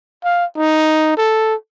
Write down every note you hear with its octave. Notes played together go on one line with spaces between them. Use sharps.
F5
D#4
A4